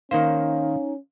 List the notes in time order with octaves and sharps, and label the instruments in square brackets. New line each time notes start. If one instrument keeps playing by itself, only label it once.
[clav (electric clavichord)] D#3 A#3 C5 [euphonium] C#4 [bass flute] D#4 [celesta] F5